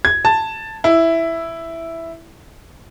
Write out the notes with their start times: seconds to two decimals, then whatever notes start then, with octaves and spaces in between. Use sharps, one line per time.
0.05 G#6
0.25 A5
0.84 E4